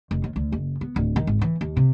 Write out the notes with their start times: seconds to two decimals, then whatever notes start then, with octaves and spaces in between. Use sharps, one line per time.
0.11 F1
0.24 D#2
0.36 D2
0.52 F#1
0.81 B3
0.96 D1
1.16 D#3
1.27 G#1
1.41 E3
1.61 D#2
1.77 C3